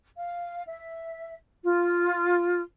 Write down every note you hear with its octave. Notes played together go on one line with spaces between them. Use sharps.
F5
E5
F4